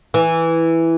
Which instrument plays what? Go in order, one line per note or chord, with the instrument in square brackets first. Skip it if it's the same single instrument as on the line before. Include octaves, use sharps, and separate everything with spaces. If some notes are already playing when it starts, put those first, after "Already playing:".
[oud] E3